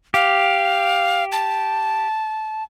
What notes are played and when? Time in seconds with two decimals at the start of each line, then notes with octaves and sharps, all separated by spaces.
0.14 G4 F5
1.32 A5